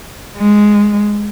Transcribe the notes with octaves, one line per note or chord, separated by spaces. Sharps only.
G#3